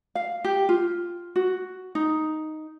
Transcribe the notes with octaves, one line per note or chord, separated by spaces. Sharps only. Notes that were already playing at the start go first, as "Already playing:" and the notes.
F5
G4
F4
F#4
D#4